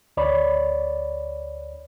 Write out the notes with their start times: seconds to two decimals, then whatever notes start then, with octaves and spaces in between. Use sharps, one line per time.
0.17 D2 C#5 D5 B5